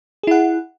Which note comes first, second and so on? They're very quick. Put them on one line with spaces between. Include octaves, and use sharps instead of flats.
G#4 E4 F#5